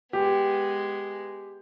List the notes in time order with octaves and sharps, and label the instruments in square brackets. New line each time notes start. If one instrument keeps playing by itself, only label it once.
[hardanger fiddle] G#3 B3 [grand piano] G4